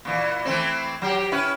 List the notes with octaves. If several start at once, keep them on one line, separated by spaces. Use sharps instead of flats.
A#2 E3
E3 A3 C4
F#3 G4
C#4 E4 B4